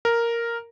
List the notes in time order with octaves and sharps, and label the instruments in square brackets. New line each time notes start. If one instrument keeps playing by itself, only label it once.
[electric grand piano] A#4